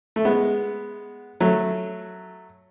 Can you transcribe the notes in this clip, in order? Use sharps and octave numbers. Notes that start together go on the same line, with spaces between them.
A3
G#3 B3
F#3 A3